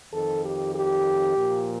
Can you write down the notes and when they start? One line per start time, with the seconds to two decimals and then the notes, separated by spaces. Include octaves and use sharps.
0.12 F2 D#3 A4
0.43 G4
0.74 G4
1.37 A#2 F3